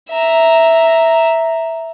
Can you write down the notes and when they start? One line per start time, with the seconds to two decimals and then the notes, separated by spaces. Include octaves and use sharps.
0.11 E5 A#5